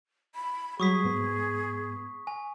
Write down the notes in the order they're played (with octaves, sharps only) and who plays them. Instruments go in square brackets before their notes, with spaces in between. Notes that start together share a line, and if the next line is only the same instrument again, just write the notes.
[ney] B5
[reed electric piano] F#3 G3 [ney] G#4 [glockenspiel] C#6 D#6 B6
[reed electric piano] G#2 B3
[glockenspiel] G#5